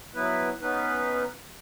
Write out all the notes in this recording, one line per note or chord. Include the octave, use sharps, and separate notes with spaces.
F#3 B3 E4 B4
B3 C#4 D#4 B4